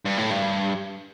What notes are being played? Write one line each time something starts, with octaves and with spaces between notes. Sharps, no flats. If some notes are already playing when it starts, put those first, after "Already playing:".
G2
A2
G2